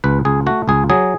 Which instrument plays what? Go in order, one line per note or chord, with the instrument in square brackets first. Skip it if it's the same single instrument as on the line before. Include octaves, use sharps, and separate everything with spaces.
[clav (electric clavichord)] C#2 B4
C#2 G#4
A3 F#4
C#2 G#4
F#3 G#4